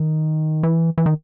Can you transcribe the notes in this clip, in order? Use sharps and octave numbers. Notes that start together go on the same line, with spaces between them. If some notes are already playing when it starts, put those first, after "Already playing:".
Already playing: D#3
E3
E3
D#3